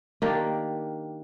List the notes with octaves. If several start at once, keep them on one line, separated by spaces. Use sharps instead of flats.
D#3 A#3 D4 G4